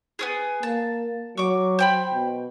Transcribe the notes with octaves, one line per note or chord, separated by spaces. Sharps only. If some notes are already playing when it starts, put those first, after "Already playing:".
B3 C#4 G#4
A#3 A5
F#3 C#6 D6
C5 G5 B5
B2